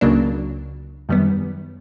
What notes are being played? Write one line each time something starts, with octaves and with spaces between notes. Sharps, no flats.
C#2 C#3 F#3 A#3 D4
F#2 D#3 G3 B3